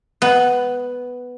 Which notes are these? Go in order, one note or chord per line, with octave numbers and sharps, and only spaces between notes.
B3